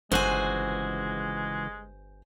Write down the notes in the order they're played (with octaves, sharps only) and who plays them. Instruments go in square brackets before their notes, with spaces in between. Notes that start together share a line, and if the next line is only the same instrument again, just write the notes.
[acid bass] G1 [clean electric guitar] C#2 E3 F#4 [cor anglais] G#3 [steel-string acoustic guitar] C5 G#5